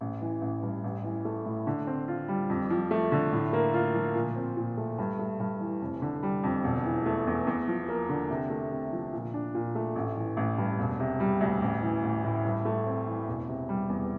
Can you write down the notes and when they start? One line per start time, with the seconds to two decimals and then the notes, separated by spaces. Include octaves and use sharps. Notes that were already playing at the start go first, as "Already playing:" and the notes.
0.01 A1
0.21 E3
0.42 A1
0.62 G2
0.84 A1
1.04 E3
1.25 A3
1.45 A2
1.67 D3
1.87 C4
2.08 F4
2.28 G3
2.49 F2
2.70 F3
2.91 A3
3.12 D3
3.32 A2
3.53 A#3
3.74 F4
3.94 F3
4.15 A#2
4.36 C4
4.57 A#2
4.77 A3
4.98 G2
5.19 A3
5.40 G2
5.61 E3
5.81 F1
6.02 D3
6.23 G3
6.43 F2
6.64 E1
6.85 E3
7.05 A3
7.27 E2
7.47 E2
7.68 F3
7.88 A#3
8.09 D3
8.30 C3
8.50 A3
8.71 C3
8.92 F3
9.13 A#2
9.34 D4
9.54 A#2
9.75 A3
9.96 A1
10.16 E3
10.37 A1
10.58 G2
10.79 E1
10.99 C3
11.20 G3
11.41 D2
11.62 A1
11.82 E3
12.03 A1
12.24 A2
12.44 G2
12.65 A3
12.86 C4
13.07 E3
13.28 E1
13.48 C3
13.69 G3
13.90 E2